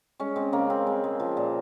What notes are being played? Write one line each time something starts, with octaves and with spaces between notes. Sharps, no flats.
G#3 C#4
G#3 C4
C#3 A#3
C#3 C4
G#3
G#3
F3
A#2